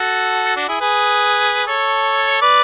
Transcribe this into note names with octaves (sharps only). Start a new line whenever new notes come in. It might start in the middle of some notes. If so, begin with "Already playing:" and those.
Already playing: F#4 A4
D4 F#4
E4 G#4
G#4 B4
A4 C#5
B4 D5